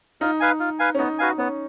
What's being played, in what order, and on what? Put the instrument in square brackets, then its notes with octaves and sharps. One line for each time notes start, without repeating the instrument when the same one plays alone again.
[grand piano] D#4 [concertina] F4
[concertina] B4 F5 G#5
F4
B4 F5 G#5
[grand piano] C#4
[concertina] B3 [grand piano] D#4
[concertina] F#4 B4 F5 G#5
[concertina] B3 [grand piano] C#4